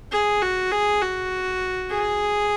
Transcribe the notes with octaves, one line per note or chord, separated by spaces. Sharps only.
G#4
F#4
G#4
F#4
G#4